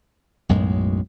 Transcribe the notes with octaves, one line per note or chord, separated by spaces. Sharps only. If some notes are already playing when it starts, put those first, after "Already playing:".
B1 F#2 A2 G#3